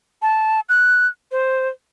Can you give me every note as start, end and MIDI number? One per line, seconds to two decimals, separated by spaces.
0.22 0.60 81
0.69 1.07 90
1.32 1.69 72